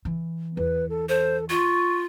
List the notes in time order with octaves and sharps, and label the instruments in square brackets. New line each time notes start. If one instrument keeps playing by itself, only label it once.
[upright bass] E3
[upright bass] E2 [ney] B4
[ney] A4
[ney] A4 [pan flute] C5
[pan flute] F4 [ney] C#6